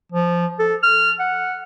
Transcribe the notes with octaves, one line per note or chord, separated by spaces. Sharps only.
F3
A4
F6
F#5